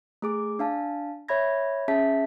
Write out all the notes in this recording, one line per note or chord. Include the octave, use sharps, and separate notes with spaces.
A3 G#4 D6
D4 F5 A5
C#5 E5 B5 G#6 A#6
C#4 G#4 E5 A5 B6